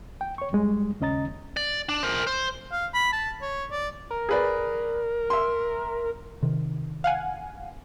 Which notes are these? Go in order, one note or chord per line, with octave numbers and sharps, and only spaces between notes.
G5
C#5 C#6
F#2 G3 G#3
D#2 C#3 C#4 D#5 A#5 A6
D5
D4
A#4 C5
C5
F5
B5
A5
C#5
D5
A#4
G#4 B4 D5
E5 C6
C3 D#3
F5 F#5 G#5